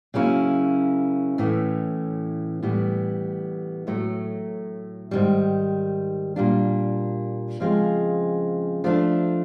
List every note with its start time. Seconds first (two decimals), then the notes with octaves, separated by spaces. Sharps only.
0.14 C#3 F#3 A#3 C#4 E4
1.38 A2 E3 A3 C#4
2.63 A2 E3 G3 B3
3.87 A2 F#3 A3
5.11 G#2 D#3 G3
6.36 A#2 G3 A#3 D4
7.60 C#3 F3 G#3 C4
8.84 F3 A3 D4